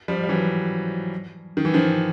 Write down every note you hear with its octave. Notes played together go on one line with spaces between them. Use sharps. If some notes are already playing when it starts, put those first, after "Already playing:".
F3 G3
G3
E3 F#3
D#3
E3
D#3 F3